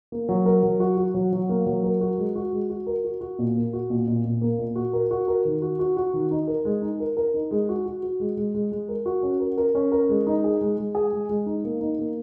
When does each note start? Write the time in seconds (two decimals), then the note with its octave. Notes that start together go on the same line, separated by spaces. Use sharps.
0.12 A#3
0.29 F#3
0.46 A#4
0.63 F#3
0.80 F#4
0.97 F#4
1.14 F#3
1.33 F#3
1.49 A#3
1.66 F#3
1.84 A#4
2.01 F#4
2.18 G#3
2.36 F#4
2.53 G#3
2.70 F#4
2.87 A#4
3.04 F#4
3.21 F#4
3.39 A#2
3.56 A#3
3.73 F#4
3.90 A#2
4.07 A#2
4.25 A#2
4.41 A#3
4.59 A#2
4.76 F#4
4.93 A#4
5.11 F#4
5.28 A#4
5.45 D#3
5.62 F#4
5.79 F#4
5.97 F#4
6.14 D#3
6.31 D#4
6.47 A#4
6.65 G#3
6.82 D#4
7.00 A#4
7.17 A#4
7.34 D#4
7.51 G#3
7.69 F#4
7.86 F#4
8.03 F#4
8.20 G#3
8.37 G#3
8.54 G#3
8.72 G#3
8.89 A#4
9.06 F#4
9.23 C#4
9.40 A#4
9.58 A#4
9.75 C#4
9.92 A#4
10.09 G#3
10.27 D#4
10.44 G#4
10.61 G#3
10.78 G#3
10.95 G#4
11.12 G#3
11.29 G#3
11.46 D#4
11.64 A#3
11.81 D#4
11.99 A#3